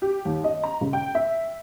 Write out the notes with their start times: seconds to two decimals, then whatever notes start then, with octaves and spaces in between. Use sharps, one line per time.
0.02 G4
0.25 D#2
0.44 D#5
0.63 A#5
0.81 C#3
0.93 G5
1.15 E5